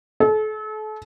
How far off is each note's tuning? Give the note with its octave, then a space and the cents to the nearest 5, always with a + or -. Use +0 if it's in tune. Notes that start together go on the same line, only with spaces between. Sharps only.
A4 -35